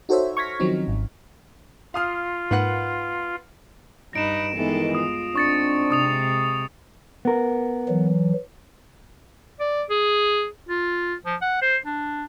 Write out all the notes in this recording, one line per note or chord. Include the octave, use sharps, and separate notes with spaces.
D#4 F#4 A4 C5 C#5 E5
C#6 F6 G#6 A#6 B6
D#3 F3 F#3 C4 C#4 D#4
G#1
F4 F5 D#6 F6
G#2 A#3 B4 F#5 F#6
G2 D#4 B4 A#6 D7 E7
D#3 E3 G#3 B3 A4
F4 D#6
G#2 C4 D4 C#6 A6 C#7
C3 G#3 C#6 D#6 F7
B3 A#4
E3 F#3
D5
G#4
F4
F3
F#5
C5
D4